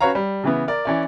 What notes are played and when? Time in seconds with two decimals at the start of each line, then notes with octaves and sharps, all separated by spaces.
0.01 C#4 F#4 B4 C#5 F5 A#5
0.15 G3
0.44 C#3 E3 B3
0.68 A#4 D5
0.85 E3 C#4 D5